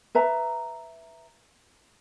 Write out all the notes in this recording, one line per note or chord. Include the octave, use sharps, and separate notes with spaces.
B4 E5 A#5